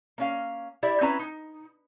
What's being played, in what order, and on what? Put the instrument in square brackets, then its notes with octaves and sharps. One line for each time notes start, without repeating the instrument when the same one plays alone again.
[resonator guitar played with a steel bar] A#3 C#4 F5
E4 G4 D5 E5
C4 C#4 E4 B4 A#5
D#4